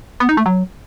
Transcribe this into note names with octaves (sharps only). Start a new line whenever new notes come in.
B3
D#4
A3
F#3